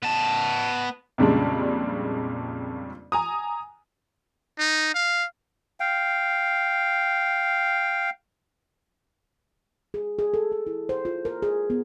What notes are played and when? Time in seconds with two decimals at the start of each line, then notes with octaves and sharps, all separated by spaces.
0.03 B3 A5
1.18 F2 A#2 C#3 G3 G#3 D4
3.12 G#5 A#5 D#6
4.59 D#4
4.94 F5
5.80 F5 G5
9.94 G#4
10.19 G#4
10.34 A4
10.52 G#4
10.67 E4
10.89 C5
11.05 F4
11.25 A#4
11.42 G#4
11.70 B3